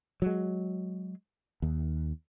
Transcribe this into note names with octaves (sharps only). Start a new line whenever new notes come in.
F#3 G#3
D#2